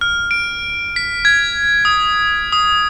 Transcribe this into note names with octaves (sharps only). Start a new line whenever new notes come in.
F6
D7
B6
G#6
D#6
D#6